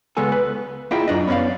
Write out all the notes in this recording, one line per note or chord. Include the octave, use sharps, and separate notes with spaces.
C#2 G#3 B3 A4 G#5
B4
A#3 E4 F4 G#4 D#5 G5
F#2 D4 D#5
B3 C#4 C#5 D5 F5